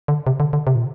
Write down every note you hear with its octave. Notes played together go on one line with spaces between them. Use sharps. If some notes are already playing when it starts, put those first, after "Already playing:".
D3
C3
D3
D3
C3
A#2